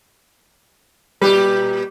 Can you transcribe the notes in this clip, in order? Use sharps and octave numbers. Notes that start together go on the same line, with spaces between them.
A#2 G3 G4 B4